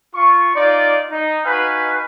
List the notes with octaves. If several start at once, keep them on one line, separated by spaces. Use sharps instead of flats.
F4 C#6
D#4 F4 D5
D#4
D#4 F#4 B4 F5 G#5